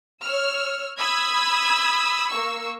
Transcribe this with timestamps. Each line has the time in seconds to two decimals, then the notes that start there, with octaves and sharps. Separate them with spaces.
0.21 C#5 E6 F6
0.97 B5 D#6 E6 G#6
2.28 A#3 C#6 E6